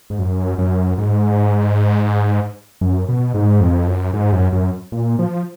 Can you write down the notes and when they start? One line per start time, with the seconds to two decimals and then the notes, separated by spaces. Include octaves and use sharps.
0.10 G#2
0.19 F#2
0.58 F#2
0.98 G#2
2.81 F#2
3.09 B2
3.34 G#2
3.61 F2
3.87 F#2
4.13 G#2
4.32 F#2
4.53 F#2
4.92 A#2
5.19 F3